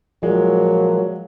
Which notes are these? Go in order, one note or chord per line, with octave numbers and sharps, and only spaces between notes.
A#2 F3 F#3 G#3